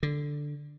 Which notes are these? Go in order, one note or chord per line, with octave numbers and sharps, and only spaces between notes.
D3